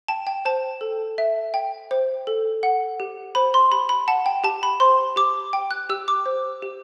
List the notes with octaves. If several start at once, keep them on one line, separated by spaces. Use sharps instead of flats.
G5 A5
G5
C5 A5
A4
E5
G5
C5
A4
F#5
G4
C5 B5
C6
G4 B5
B5
F#5 A5
G5
G4 A5
B5
C5 C6
G4 D6
G5
F#6
G4 E6
D6
C5
G4